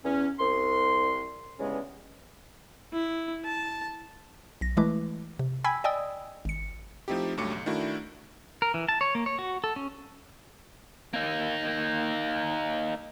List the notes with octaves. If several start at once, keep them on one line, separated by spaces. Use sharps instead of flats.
E2 C#4
C2 C6
G2 C#3 E3 G#3 B3 C#4
E4
A5
B1 A#6
E3 G#3 A3 E4 B4 D6
C3
G5 G#5 B5 E6 G#6 B6
D5 D#5 G5 G#5 D#6 E6
G#1 C#7
F3 A3 C4 D#4 E4 G4
C#2 G2 F#3 A3 D6 C#7
B1
D#3 A3 D4 E4 F#4
A#4
E3
A5
C#5
A#3
C#5
F#4
A4
C#4
A#3 D#4